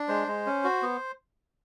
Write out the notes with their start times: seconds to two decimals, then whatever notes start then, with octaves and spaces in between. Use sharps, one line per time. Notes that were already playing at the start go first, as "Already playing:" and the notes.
Already playing: D4
0.09 G#3 C5
0.28 G#3
0.46 C#4
0.64 F#4
0.82 B3